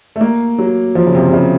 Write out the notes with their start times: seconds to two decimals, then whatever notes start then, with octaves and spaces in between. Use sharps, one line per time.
0.16 A3
0.21 A#3
0.58 F#3
0.95 F3
1.06 C#3
1.15 C3
1.28 C3
1.33 C#3